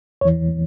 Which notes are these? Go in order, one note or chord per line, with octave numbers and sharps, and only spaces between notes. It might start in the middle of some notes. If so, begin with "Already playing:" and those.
E2 E3 C#5